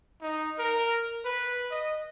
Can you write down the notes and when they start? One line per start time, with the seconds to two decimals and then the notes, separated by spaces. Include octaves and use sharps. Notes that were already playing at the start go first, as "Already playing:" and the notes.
0.22 D#4
0.59 A#4
1.25 B4
1.71 D#5